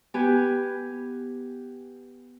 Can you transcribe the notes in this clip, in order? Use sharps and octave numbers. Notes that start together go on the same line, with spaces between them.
B3 G4 B4 G#5